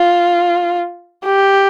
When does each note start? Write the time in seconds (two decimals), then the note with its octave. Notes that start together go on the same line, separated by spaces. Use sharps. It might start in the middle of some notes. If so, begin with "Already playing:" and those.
Already playing: F4
1.25 G4